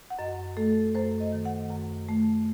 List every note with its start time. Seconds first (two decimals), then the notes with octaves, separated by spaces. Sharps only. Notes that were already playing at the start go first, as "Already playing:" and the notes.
0.10 F#5
0.18 F#2 D#5
0.57 A3 A4
0.95 F#2 C5
1.20 D#5
1.32 D#3
1.45 F#5
1.71 F#2
2.08 A3